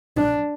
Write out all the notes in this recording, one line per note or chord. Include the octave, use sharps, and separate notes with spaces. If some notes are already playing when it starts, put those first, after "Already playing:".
D4